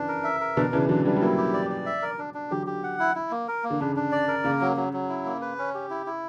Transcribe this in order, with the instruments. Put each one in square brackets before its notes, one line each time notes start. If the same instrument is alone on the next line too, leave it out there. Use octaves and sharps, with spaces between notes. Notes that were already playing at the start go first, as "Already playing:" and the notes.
Already playing: [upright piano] C#3 E3 [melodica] D4
[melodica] A#4
E5
A#4
[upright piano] B2 D3 [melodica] D4
[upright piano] C#3 E3 [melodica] D4
[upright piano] D3 F#3 [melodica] D4
[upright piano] E3 G3 [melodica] D4
[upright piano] G3
[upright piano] F#3 A#3 [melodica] E4
[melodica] G4
D5
D5
E5
A#4
D4
D4
[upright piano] D3 F#3 [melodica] G4
[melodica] G4
F#5
E4
E4
A#3
A#4
A#3
[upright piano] D3
[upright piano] C#3 [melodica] D4
[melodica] D4
D5
A#4
[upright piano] C#3 [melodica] A#3
[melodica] F#3
F#3
F#3
E4
A#3
B4
C#4
G4
E4
E4